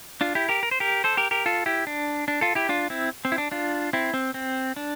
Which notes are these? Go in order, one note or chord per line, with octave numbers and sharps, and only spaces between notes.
D4 F4
E4 G4
G4 A#4
A#4
C5
G4 A#4
A4 C5
G4 A#4
G4 A#4
F4 A4
E4 G4
D4
D4
F4 A4
E4 G4
D4 F4
C4 E4
C4
E4
D4
D4 F4
C4 E4
C4
C4
D4